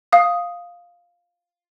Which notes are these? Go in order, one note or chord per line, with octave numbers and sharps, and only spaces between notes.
F5 D#6